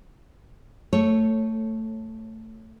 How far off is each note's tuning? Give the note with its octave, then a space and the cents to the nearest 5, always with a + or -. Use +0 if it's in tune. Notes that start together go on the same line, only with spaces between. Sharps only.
A3 +15 A4 +0 C#5 +0